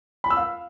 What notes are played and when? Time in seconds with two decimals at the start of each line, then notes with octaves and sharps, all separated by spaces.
0.24 B5
0.30 E6
0.37 F5